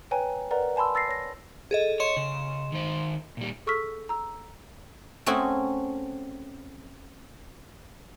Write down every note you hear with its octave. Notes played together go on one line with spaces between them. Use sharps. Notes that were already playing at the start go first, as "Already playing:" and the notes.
B4 C#5 G5 G#5 A#5
A#4 B4 D5 F#5 A#5
G#5 A5 B5 C6 E6
E6 A6 A#6 C7
C#5 A#6
G#4 A4 D#5
C#5 D#5 C6 E7
C#3
D#3 C5
A#2 G3
G#4 A4 C#6 E6 F6 B6
A#5 E6
A3 C4 C#4 F#4 G#4